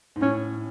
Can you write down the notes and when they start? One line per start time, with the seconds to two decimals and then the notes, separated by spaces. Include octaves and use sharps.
0.16 G#2
0.21 A2 C#4